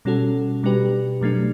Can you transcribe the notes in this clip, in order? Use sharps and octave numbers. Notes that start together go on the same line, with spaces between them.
B2 G3 C#4 F#4 A4
B2 G3 D4 G4 B4
B2 F#3 A3 D4